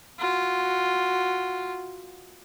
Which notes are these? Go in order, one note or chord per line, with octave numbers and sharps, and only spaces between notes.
F4 F#4